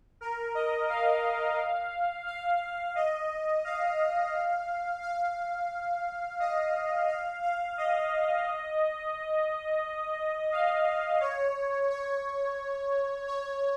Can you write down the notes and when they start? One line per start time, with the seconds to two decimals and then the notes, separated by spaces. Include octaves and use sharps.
0.21 A#4
0.55 D#5
0.89 F5
2.27 F5
2.95 D#5
3.64 F5
5.02 F5
6.40 D#5
7.08 F5
7.43 F5
7.77 D#5
10.52 F5
11.21 C#5
11.90 C#5
13.27 C#5